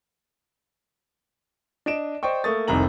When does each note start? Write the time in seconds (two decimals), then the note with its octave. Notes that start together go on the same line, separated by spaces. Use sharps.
1.86 D4 D#5 D7 E7
2.23 C5 D5 D#5 G5 C#6
2.44 A3 A#3 C#6 D#6 A6
2.68 F1 C2 D#3 C4 A#5 F#7